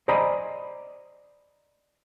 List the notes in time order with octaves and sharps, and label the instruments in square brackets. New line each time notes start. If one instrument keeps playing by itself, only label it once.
[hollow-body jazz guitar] C5 D5 D#5 G#5 A#5 B5